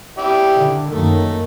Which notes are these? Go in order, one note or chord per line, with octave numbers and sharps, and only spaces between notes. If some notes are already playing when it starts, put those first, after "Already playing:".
E4 G4 D5
D3
F#2 D#3 A3 A#3